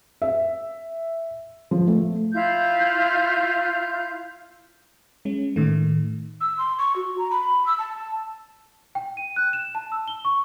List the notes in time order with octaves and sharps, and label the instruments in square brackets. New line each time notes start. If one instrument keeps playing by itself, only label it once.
[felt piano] E5
F3
A3
[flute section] E4 F4 F5 G6
[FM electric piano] G#3 C#4
A2 D#3 A3
[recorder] E6
C6
C#6
F#4
A#5
B5
E6
A5
[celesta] G5
D#7
F#6
E7
A5
E6
G7
C#6